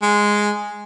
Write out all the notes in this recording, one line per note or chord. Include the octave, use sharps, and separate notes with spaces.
G#3